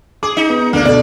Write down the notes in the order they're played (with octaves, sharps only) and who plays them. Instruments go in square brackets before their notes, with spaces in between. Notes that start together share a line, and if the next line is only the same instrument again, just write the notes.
[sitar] G#4 [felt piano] D6
[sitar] D#4
[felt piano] B3
[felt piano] D2 [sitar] A#3 D4
[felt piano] B2 A4 [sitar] D5